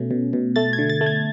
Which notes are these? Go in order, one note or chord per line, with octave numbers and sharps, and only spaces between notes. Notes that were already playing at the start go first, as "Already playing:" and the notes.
Already playing: B2 A3 C#4
B2
B2
A3 A6
G#6
D3
A6
A3
G#6